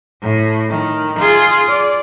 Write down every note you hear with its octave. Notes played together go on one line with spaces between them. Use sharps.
A2
D#3
F4 G#4
D5